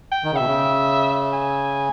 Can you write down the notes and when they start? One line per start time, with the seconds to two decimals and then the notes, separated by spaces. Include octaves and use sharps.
0.12 G5
0.24 D#3
0.32 C#3
0.36 B2 E5
0.46 C#3
1.33 G#5